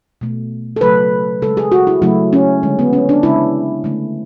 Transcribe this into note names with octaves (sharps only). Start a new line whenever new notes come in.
B2 A3
A4
C#3 F#3 A3 B4
C#3 G#3 A4
G#4
F#4
E4
C#3 F#3 A3 E4
C#4
D3 G#3
B3
C#4
D4
C#3 G#3 E4
D3 A3